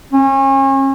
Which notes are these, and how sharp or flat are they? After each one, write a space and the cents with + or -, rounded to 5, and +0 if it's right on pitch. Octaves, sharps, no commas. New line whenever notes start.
C#4 -35